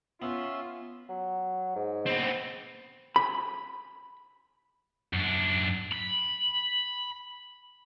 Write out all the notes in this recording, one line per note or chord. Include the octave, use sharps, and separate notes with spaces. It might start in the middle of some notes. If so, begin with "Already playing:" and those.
B3 C#4 F4 E5 C6
F#3
G#2
B3 C4
B5
F#2 D4
B5